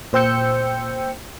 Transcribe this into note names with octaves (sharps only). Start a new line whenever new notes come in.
A#2 C5 G5 E6 G6 C#7